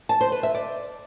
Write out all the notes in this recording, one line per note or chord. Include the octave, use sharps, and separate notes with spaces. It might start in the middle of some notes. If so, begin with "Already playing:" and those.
A5
C5
B4
E5
D5